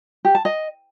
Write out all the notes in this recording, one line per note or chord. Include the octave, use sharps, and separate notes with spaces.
G4
A5
D#5